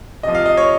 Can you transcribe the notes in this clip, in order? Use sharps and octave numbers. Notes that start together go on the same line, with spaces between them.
C3 F3 D#5
F5
D#5
C#5